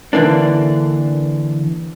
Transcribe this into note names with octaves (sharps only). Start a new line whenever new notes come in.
D3 E3 A#3 D4